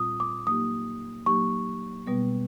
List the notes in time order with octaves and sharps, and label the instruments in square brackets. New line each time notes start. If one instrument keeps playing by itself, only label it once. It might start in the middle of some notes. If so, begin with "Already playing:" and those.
Already playing: [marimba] A#2 G3 C4 F4 [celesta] D#6
[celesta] D6
[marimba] F#3 A#3 D#4 G4 [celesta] D#6
[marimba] F#3 A#3 D#4 G4 [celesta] C#6
[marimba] B2 G3 B3